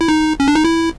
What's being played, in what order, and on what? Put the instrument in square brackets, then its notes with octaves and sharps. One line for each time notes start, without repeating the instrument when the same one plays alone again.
[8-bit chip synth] E4
D#4
C#4
D4
D#4
E4